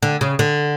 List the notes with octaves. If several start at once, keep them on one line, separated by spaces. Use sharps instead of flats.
D3
C#3
D3